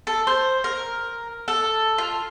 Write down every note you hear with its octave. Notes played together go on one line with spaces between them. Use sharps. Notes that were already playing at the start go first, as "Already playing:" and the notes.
A4
C5
A#4
A4
F4